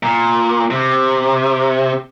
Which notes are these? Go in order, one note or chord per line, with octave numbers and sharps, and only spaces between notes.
A#2
C3